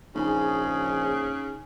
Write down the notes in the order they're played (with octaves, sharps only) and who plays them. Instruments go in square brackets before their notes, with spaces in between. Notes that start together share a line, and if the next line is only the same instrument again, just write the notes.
[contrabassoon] A#1 [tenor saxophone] C#3 [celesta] D#4 G#5 [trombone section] G#4